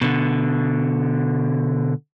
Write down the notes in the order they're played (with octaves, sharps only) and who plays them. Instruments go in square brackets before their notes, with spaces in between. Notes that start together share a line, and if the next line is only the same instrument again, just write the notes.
[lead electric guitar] B2 D3